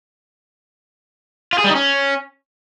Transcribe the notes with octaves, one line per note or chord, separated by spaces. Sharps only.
F4
G#4
G3
D#4
C#4